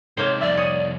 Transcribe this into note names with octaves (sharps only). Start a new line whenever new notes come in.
C3 G#3 A#3 D#4 C5 C#5
C2 F2 D5 E5
C#5 D#6 D#7